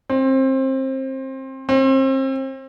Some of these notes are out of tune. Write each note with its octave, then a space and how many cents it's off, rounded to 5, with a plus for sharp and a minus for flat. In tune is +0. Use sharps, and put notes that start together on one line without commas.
C4 +25
C4 +35